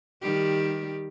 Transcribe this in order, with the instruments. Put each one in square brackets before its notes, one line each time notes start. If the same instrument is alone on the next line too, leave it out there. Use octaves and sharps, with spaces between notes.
[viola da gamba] D#3 G3 G4